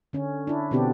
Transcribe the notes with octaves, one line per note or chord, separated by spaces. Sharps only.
D3 C#4
D4 E4
B2 D3 B3 C4 D4 G4